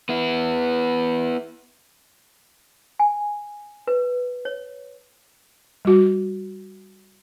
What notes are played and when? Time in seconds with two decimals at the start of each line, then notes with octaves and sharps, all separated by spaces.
0.09 B3 E4
2.99 G#5
3.87 B4
4.45 C#5
5.85 G3 F#4